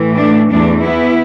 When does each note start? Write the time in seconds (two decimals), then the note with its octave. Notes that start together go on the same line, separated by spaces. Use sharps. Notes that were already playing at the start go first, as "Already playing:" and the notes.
Already playing: A2 E3
0.17 A3 D4
0.49 E2 E3 A3 D4
0.83 B3 E4